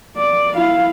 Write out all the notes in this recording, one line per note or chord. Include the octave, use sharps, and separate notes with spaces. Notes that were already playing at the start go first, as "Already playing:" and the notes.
D5
E4 F5